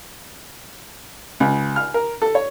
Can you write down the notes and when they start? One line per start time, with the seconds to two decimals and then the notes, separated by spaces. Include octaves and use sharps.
1.40 C#2
1.76 F6
1.94 A#4
2.22 A4
2.35 C#5